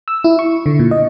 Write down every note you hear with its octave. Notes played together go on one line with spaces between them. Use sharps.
E6
E4
C#6
D3
A#2
D#5